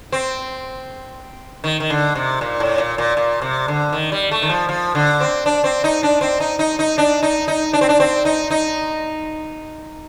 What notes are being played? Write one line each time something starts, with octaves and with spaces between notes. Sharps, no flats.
C4
D#3
D#3
D3
C3
A#2
A2
A#2
A#2
A#2
C3
D3
D#3
G3
A3
D#3
F3
F3
D3
C4
D4
C4
D#4
D4
C4
D#4
D#4
D#4
D4
D#4
D#4
D4
C4
D4
C4
D#4
D#4